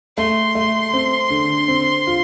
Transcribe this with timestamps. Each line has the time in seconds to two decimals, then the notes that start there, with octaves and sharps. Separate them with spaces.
0.16 A3 C6
0.55 A3
0.93 C4
1.30 D3
1.68 C4
2.07 F4